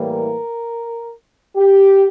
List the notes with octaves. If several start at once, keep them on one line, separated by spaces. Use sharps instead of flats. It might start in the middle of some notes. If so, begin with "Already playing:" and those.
Already playing: A2 E3 G3 A#3
A#4
G4